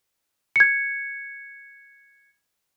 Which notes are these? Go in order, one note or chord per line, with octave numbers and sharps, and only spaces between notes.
G#6 C#7